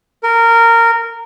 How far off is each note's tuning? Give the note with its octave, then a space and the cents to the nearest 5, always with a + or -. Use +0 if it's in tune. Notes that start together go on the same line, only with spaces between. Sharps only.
A#4 -15